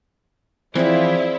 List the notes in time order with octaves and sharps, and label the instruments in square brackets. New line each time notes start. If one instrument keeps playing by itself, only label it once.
[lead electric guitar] E3 F3 [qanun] C4 G#4 [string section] E4 F4 E5 [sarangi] D5